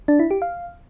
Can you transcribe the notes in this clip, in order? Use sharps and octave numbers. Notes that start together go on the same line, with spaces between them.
D4
E4
G4
F5